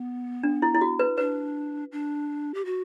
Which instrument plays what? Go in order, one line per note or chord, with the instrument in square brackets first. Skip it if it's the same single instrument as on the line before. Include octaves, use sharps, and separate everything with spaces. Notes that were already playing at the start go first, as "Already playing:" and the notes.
Already playing: [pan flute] B3
[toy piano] D4
E4
E4
F#4
B4
[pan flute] D4 [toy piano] B4
[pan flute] D4
G4
F#4